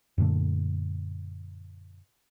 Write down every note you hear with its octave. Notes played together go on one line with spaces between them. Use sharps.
F#2 A#2 D3 A3